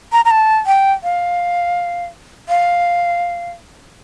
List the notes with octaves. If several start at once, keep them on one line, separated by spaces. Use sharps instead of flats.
A#5
A#5
A5
G5
F5
F5